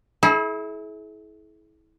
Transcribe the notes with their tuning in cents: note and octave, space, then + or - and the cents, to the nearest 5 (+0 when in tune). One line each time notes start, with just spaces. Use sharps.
E4 -25 G#4 +45